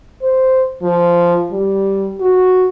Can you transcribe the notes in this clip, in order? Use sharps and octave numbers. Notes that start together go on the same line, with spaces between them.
C5
F3
G3
F#4